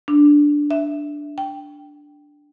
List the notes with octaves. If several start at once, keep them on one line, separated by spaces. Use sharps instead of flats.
D4
E5
G5